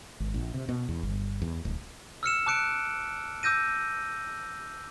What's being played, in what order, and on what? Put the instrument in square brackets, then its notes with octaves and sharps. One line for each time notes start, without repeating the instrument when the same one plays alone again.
[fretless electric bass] G#1
A#1
C3
B2
E2
G1
E2
D1
[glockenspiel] E6 F6 C#7 E7
A5 D6 F#6 C#7 D7
D6 E6 G6 A#6 D#7